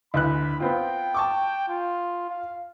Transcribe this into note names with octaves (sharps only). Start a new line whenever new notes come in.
D2 E3 B5 F#6
B3 C4 F4 G5
A5 C#6 D6
F4
F5